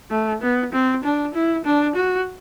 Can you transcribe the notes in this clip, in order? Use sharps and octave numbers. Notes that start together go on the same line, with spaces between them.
A3
B3
C4
D4
E4
D4
F#4